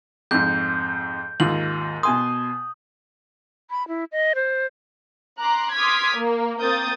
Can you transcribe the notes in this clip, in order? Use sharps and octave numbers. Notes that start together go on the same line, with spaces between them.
F2 G#2 G6
D#2 G#2 F4 F#7
B2 G#5 C6 D#6
B5
E4
D#5
C5
A#5 C6 D6 F#6
C6 D6 D#6 F6 G#6 B6
A#3
A#3 C4 D#6 G6 A6